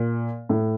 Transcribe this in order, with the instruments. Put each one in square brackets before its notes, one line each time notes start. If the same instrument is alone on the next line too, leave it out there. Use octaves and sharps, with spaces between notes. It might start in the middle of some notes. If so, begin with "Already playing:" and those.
Already playing: [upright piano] A#2
A2